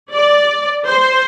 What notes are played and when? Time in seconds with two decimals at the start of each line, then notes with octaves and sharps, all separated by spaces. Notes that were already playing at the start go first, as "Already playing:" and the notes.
0.13 D5
0.85 C5